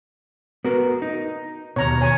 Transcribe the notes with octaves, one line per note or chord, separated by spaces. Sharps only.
B3 F#4 A#4
D#4
D#2 B2 C#5 A#5
C#5 G#5